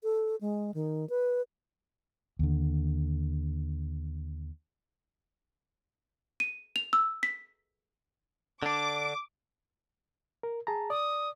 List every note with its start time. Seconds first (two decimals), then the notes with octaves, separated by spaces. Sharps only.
0.03 A4
0.41 G#3
0.74 D#3
1.09 B4
2.39 D#2 D3
6.40 D#7
6.76 F7
6.93 E6
7.23 B6
8.63 D3 D4 D6
10.43 A#4
10.67 G#4 A5 A#5
10.90 D5 D#6